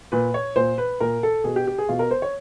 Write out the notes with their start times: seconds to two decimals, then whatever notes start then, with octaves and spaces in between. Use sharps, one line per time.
0.12 A#2 B4
0.34 C#5
0.56 A#2 C5
0.78 B4
1.00 A#2 A#4
1.23 A4
1.44 B2 G#4
1.56 G4
1.67 G4
1.78 G#4
1.89 B2 F4
1.99 A#4
2.11 C5
2.22 C#5